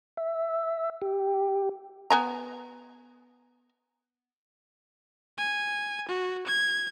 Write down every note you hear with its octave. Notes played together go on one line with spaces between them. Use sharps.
E5
G4
B3 G#5 A#5
G#5
F#4
G#6